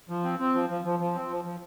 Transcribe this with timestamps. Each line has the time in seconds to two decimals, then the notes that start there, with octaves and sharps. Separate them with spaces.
0.09 F3
0.24 C4
0.39 C4
0.54 F3
0.70 F3
0.85 F3
1.00 F3
1.15 C4
1.30 F3
1.45 F3